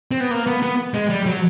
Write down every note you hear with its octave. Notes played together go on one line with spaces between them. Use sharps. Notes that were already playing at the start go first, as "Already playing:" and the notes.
C4
B3
A#3
B3
B3
G#3
G3
F#3